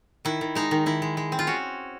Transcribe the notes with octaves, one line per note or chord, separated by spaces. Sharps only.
D#3 E4
D#3
G#3 D#4
D#3
D#3 E4
G#3
G#3
C4
F4
C#4 F#4